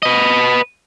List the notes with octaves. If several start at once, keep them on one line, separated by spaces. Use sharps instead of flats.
B4 D#5